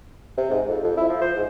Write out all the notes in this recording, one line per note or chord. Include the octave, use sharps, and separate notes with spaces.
C3
G#2
F2
F2
E4
F3
C5
G#2